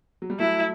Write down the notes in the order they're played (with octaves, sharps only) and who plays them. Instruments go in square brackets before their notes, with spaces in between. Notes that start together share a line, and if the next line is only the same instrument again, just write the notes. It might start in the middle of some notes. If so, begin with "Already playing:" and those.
[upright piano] F#3
G3
[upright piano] F#3 A3 [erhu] E4